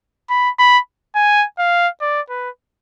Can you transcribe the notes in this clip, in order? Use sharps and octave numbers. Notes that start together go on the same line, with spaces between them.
B5
B5
G#5
F5
D5
B4